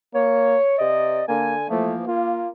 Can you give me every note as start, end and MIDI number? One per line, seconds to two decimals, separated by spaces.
0.15 0.59 58
0.15 0.78 73
0.78 1.21 48
0.78 1.21 74
0.78 1.26 75
1.28 1.65 50
1.28 1.55 58
1.28 1.65 80
1.70 2.07 52
1.70 2.07 53
1.70 1.94 57
1.70 2.07 58
2.07 2.49 58
2.07 2.50 65